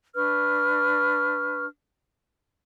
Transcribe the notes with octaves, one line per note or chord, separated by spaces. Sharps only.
D4 B4 C#6 F6